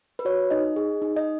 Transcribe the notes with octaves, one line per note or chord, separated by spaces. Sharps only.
B4
F#4 C#5
D#4 D#5
G#4
D#4
D#5